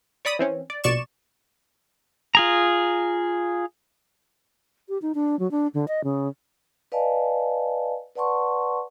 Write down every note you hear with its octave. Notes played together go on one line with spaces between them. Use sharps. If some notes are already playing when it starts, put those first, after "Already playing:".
C#5 D5 B5 D#6
E3 C4 C#4
D5
A#1 B2 D5 C#6 E7
F4 G#4 A#5
G4
D#4
D4
F#3
D4
D3
D#5
C#3
B4 D5 D#5 F5 G#5 A5
B4 D5 F#5 A5 C6 C#6